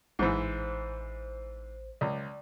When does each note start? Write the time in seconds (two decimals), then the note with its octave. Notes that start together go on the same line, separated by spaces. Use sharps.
0.19 A1 G#2 E3 C5
2.01 C#2 D5